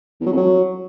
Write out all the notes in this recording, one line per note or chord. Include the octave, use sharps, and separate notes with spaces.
E2
F#3
F2
F#3